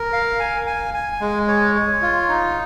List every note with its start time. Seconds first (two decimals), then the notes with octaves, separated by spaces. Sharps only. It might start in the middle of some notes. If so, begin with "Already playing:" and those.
Already playing: A#4
0.13 F5
0.40 G#5
0.67 G#5
0.94 G#5
1.21 G#3
1.48 C#5
1.75 C#5
2.02 F4
2.29 D#4